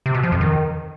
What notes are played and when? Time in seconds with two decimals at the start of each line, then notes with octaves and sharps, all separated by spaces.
0.06 C3
0.14 B2
0.23 F3
0.32 F2
0.41 D#3